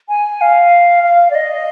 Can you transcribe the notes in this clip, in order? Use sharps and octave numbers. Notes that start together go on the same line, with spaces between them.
G#5
F5
F5
D5
D#5